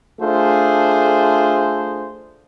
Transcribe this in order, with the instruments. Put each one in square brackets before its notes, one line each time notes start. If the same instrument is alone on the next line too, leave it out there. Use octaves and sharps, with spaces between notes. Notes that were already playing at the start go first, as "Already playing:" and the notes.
[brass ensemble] A3 D4 F4 G#4 C5